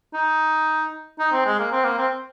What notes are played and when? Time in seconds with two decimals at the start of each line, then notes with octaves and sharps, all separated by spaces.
0.14 D#4
1.19 D#4
1.32 C4
1.45 G#3
1.59 A#3
1.72 C4
1.85 A#3
1.98 C4